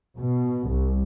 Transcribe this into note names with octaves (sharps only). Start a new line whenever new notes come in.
B2
C2